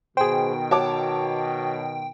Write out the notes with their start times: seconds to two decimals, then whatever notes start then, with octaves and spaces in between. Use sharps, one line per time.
0.17 B2 D#3 G#4 C5 G5
0.71 F#4 C#5 A5 D6